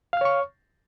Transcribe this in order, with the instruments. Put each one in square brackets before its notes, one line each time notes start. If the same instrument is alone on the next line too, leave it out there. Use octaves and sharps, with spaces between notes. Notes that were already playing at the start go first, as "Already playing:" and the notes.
[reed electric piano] F5
F6
C#5
C#6